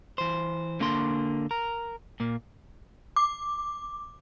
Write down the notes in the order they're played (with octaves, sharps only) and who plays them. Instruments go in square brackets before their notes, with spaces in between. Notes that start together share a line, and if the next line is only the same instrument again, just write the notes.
[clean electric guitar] E3 C5
D3 A#3 D4 A#4 C6
A#4
A#2 A#3
[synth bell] D6